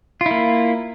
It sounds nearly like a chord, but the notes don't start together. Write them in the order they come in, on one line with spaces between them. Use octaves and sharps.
F4 E4 A#3